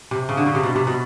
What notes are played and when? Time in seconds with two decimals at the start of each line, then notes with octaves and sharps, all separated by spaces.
0.11 C3
0.29 C#3
0.37 D3
0.46 C#3
0.55 C3
0.63 B2
0.76 C3
0.87 B2